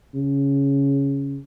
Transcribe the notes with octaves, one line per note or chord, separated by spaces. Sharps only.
C#3